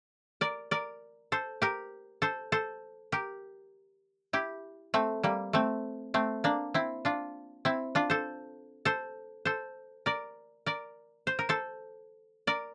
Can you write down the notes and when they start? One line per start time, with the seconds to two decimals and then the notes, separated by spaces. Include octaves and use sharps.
0.41 A#4 D5
0.71 A#4 D5
1.32 A4 C5
1.62 G4 A#4
2.22 A4 C5
2.52 A4 C5
3.12 G4 A#4
4.33 E4 G4
4.94 A3 C4
5.23 G3 A#3
5.53 A3 C4
6.14 A3 C4
6.44 A#3 D4
6.74 C4 E4
7.05 D4 F4
7.65 C4 E4
7.95 D4 F4
8.10 A4 C5
8.85 A4 C5
9.45 A4 C5
10.06 A#4 D5
10.66 A#4 D5
11.27 C5
11.39 A#4
11.49 A4 C5
12.47 A#4 D5